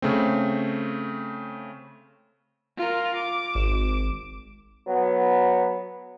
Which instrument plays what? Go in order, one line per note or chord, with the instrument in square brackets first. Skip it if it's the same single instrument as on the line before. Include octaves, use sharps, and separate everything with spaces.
[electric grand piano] C#3 A3 C4
[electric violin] F4 A#4
D6
[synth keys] G#1 E7
[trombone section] F#3 B3